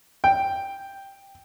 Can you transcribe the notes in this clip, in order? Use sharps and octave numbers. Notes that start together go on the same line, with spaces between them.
G5